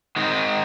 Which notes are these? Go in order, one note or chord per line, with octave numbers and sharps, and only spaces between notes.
D#3 G#3 C4 D#4